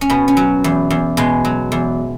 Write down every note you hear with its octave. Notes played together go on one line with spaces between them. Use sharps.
C#4
B2 B3
C#4
F#3
E2
E2
B2 G#3
F#3
E2